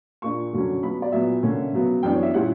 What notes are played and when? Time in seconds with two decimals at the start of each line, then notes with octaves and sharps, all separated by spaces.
0.22 A#2 A#3 D4 C#6
0.53 F#2 D3 F#3 C#4
0.83 B2 F#3 B3 B5
1.02 D5
1.12 A#2 F#3 B3 E5
1.43 D3 A#3 C#4
1.73 C#3 F#3 B3
2.03 F#2 E3 B3 D4 G5
2.14 C#5
2.23 E5
2.34 A#2 G3 C#4 E4 F#5